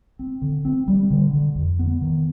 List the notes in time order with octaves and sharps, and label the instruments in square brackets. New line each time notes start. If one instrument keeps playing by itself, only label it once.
[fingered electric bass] C4
D3
C4
G3
D3
D3
F2
B3
D#3